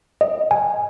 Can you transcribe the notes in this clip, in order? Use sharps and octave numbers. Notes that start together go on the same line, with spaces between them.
D#5
G#5